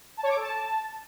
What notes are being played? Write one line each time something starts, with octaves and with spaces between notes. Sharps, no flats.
A5
C#5
D6
A4
A5